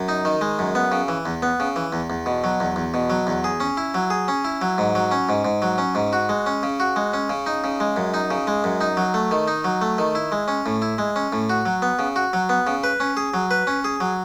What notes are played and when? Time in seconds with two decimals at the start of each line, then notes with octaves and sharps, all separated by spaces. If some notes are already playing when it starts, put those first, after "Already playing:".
Already playing: F#2
0.08 D#4
0.25 D#3
0.41 G#3
0.59 F#2
0.75 B3
0.92 C#3
1.08 E3
1.26 E2
1.42 B3
1.60 C#3
1.76 E3
1.93 E2
2.10 E2
2.26 B2
2.44 F#3
2.60 E2
2.76 E2
2.94 B2
3.10 F#3
3.27 E2
3.44 G#4
3.60 C#4
3.77 E4
3.94 F#3
4.10 G#4
4.28 C#4
4.45 E4
4.62 F#3
4.78 G#2
4.95 F#3
5.11 C#4
5.29 G#2
5.45 G#2
5.62 F#3
5.78 C#4
5.95 G#2
6.13 F#4
6.29 G#3
6.46 C#4
6.63 C#3
6.80 F#4
6.96 G#3
7.13 C#4
7.30 C#3
7.46 D#4
7.64 C#3
7.80 G#3
7.97 F#2
8.14 D#4
8.31 C#3
8.47 G#3
8.64 F#2
8.81 D#4
8.97 F#3
9.14 A3
9.31 D#3
9.48 D#4
9.64 F#3
9.81 A3
9.98 D#3
10.15 E4
10.32 G#3
10.48 C#4
10.66 A2
10.82 E4
10.98 G#3
11.16 C#4
11.33 A2
11.49 F#4
11.66 F#3
11.82 B3
11.99 C#3
12.16 F#4
12.33 F#3
12.49 B3
12.67 C#3
12.84 B4
13.00 C#4
13.17 G#4
13.34 F#3
13.51 B4
13.67 C#4
13.85 G#4
14.00 F#3